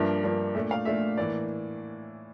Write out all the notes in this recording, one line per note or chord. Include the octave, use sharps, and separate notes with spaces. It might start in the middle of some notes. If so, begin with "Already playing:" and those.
Already playing: G2 F3 A#3 D4 E5
G2 F3 A#3 D4
A#2 A3 D4 E5
F5
A#2 A3 D4 E5
A2 E3 A#3 D5